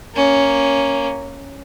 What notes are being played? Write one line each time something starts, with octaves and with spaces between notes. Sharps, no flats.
A#3 C#4